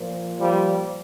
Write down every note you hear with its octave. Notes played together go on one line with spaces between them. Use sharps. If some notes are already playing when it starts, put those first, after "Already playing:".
Already playing: A#2 F3
F3 G3